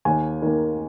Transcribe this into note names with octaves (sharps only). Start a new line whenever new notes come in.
D#2 G#5
D#3 A#3